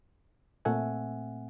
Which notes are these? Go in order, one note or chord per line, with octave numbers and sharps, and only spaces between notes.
A#2 A3 C4 E5 F#5 G#5